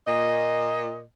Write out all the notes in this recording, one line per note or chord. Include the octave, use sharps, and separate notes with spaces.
A#2 D#5